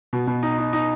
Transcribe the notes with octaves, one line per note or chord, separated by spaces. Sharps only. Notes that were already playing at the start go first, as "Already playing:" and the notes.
B2
B2
D#4
D#4
D#4